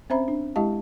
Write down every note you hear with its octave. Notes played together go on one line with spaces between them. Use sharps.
C4 C#4 C5 E5 A#5 B5
D4
G#3 E4 G4 D#5 F5 A5